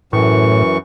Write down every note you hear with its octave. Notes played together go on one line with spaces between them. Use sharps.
F#2 A2 E3 C#6